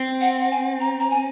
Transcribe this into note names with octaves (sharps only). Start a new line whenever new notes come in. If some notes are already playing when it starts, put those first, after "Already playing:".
Already playing: C4
F#5
F#5
G#5
A#5
A#5
G#5